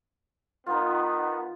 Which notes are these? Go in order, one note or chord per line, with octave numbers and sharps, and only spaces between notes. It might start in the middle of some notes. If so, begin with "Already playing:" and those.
D#3 B3 D#4 F4